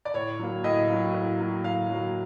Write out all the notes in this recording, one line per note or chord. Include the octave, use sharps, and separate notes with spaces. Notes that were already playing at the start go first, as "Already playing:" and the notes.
D5
A2 C#5
F#3 A#3
A2 D#5
F#3 A#3
A2
F#3 A#3
A2 F5
F#3 A#3